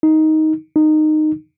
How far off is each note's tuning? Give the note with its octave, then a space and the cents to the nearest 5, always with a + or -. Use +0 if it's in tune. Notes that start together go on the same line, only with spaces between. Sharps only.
D#4 +10
D#4 -15